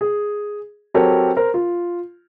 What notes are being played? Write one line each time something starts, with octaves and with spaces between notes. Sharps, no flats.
G#4
F#3 C4 G4 A4 A#4 C#5
A#4 C5
F4